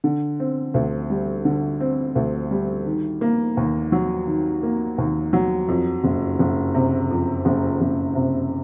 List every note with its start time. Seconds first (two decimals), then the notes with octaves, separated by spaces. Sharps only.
0.04 D3
0.40 C4
0.74 D2
1.10 G3
1.45 D3
1.80 C4
2.15 D2
2.51 G3
2.86 D#3
3.21 A#3
3.57 D#2
3.92 F#3
4.27 D#3
4.63 A#3
4.98 D#2
5.33 F#3
5.68 F2
6.04 F#1
6.39 F#1
6.74 C3
7.10 F2
7.45 F#1
7.81 F#1
8.15 C3